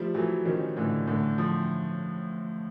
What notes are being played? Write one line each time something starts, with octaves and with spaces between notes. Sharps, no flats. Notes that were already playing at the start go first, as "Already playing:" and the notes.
Already playing: F3 G3 A3
E3 F#3 A3
D#3 F3 C#4
A2 D3 E3
A2 D3 E3
F3